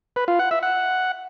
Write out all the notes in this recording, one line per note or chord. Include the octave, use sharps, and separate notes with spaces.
B4
F4
F#5
E5
F#5